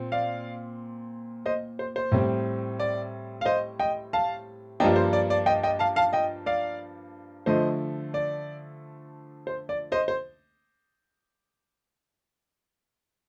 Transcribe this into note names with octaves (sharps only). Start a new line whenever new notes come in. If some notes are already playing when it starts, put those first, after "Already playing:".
Already playing: A#2 C4
D5 F5
C5 D#5
C5
C5
A2 G3 C4
D5
F5
C5 D#5
D#5 G5
F5 A5
G2 F3 A#3 D4 D#5 G5
C5
D5
D5
D#5 G5
D#5 G5
F5 A5
F5 A5
D#5 G5
D5 F5
D3 F3 A3 C5 D#5
D5
C5
D5
C5 D#5
C5